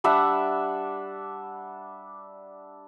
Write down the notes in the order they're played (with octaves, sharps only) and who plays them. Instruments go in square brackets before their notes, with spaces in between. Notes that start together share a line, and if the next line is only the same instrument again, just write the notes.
[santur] G3 D4 E5 F#5